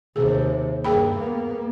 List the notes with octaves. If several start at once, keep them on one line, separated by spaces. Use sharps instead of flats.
D#2 C3 G#4
G2 A#3 G#4 G5 B5
A#3 B3